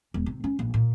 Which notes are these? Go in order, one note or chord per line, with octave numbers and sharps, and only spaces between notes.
E1
C3
C#4
A#1
A#2